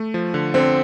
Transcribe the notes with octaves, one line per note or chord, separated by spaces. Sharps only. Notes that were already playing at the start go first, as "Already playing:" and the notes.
Already playing: A3
F3
D3
D3 C4